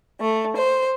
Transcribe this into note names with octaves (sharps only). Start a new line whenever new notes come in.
A3
C5